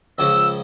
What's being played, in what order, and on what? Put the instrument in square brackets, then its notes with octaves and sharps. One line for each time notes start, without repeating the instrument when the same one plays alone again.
[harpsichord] C#2 C#3 F3 [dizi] E6